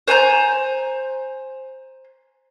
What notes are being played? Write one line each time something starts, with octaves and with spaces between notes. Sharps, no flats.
C5 G#5 A#5 G6